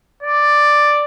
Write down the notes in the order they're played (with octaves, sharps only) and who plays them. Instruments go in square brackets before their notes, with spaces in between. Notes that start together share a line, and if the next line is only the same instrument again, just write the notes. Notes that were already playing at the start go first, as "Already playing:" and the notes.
[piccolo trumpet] D5